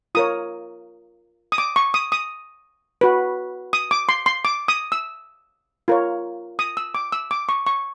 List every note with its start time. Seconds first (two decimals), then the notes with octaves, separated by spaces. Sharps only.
0.15 F4 A#4 C#5 D#6
1.52 D#6
1.58 D6
1.76 C#6
1.94 D#6
2.12 D#6
3.01 F#4 B4
3.73 D#6
3.91 D6
4.09 C6
4.26 C6
4.45 D6
4.68 D#6
4.92 E6
5.88 F4 A#4 C#5
6.59 D#6
6.77 E6
6.95 D6
7.12 E6
7.31 D6
7.49 C#6
7.66 C#6